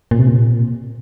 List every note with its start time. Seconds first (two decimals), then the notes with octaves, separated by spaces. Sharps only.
0.11 A#2
0.19 C3
0.27 A#2